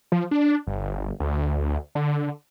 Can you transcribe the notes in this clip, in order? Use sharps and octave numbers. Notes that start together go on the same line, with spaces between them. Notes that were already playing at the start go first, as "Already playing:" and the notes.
F3
D4
G1
D2
D3